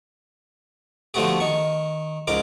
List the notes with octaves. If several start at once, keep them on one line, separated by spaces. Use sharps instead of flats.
D3 F3 A3 B3 F#4 G4
D#3 C#6
C#2 G#2 A#4 D6